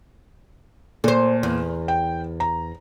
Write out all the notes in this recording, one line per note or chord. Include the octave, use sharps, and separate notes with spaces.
A#2 A4 C5
E2
G5
A#5